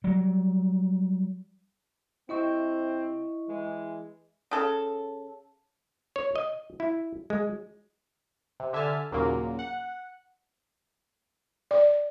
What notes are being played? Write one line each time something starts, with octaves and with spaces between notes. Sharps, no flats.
F#3 G3
C3 C4 E4 D#5 C#6
E3 G#3
C#3 A4
C#5
D#5
E4
G#3
C3
D3 E5 G#5 A5 F6
D#2 A#2 C#3 F#3 A#3
F#5
D5